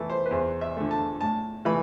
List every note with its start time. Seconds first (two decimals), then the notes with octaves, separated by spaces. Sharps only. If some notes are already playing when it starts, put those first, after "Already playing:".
Already playing: E3 A3 A5
0.10 C5
0.26 B4
0.31 E2 C5
0.61 E5
0.77 D3 A3
0.91 A5
1.21 A2 A5
1.65 E3 A3 B5